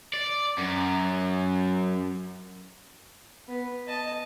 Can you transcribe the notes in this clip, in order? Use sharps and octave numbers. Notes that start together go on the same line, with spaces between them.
D5
F#2
B3
D#5 A5